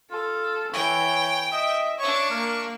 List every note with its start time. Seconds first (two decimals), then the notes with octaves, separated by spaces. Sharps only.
0.11 F4 A4
0.73 E3 C#5 G5
1.52 D#5 E5
1.98 D4 C#5 C#6
2.30 A#3 A#4